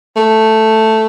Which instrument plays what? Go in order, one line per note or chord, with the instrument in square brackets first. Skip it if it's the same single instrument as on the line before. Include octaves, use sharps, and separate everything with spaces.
[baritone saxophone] A3